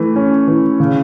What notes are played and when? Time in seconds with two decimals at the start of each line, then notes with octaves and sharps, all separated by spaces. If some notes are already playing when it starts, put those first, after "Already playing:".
Already playing: E3 A3
0.16 C#4
0.48 E3
0.80 C#3